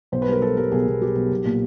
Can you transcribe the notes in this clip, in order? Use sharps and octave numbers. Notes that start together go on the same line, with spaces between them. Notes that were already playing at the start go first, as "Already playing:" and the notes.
B1 C5
B4
G3 A#4
G3 A4
G3 A#4
B1 G#4
B1
B1 G4
B1
B1
A#2